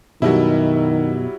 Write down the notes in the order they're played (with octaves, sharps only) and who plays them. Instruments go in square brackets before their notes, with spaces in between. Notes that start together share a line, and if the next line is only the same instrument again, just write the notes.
[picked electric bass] F#2 B2 [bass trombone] D#3 [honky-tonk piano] F#3 G3 E4